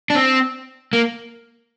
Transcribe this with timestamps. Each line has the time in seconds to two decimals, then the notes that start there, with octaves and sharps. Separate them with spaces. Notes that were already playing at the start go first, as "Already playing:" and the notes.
0.10 D4
0.15 C4
0.93 A#3